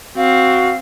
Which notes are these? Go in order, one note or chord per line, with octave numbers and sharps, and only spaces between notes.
C4 F#4 F5